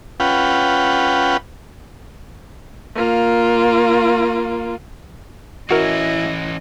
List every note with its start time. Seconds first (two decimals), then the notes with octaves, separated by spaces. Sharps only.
0.20 C#4 F4 B4 F#5 G5
2.95 A#3 F4
5.71 E3 C#4 E4 F#4 A#4 D#5